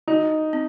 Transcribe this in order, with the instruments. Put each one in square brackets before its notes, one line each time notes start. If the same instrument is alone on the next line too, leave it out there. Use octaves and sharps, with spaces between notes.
[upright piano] D#4 [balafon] F#4
[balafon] C4